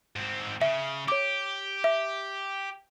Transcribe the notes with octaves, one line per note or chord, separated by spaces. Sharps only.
G#2 C4
C#3 E5
G4 C#5 D6
E5